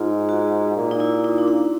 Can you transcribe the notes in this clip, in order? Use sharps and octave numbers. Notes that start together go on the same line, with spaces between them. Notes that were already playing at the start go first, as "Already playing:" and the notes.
Already playing: G#2 F4
F#4
A#2
D#4
E4
D#4
D4
D#4